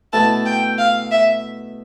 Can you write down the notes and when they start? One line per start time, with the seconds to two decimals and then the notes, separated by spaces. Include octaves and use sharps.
0.13 B2 A3 E4 A5
0.46 G5
0.78 F5
1.11 E5